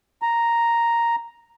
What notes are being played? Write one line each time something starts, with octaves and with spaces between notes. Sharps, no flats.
A#5